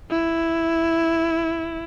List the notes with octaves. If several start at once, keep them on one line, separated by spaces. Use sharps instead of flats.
E4